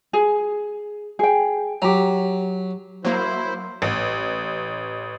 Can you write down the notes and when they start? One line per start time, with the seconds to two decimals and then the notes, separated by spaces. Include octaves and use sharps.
0.13 G#4
1.19 G#4 G5
1.82 F#3 G4 A#5
3.05 F#3 A#3 E4 C5
3.82 A1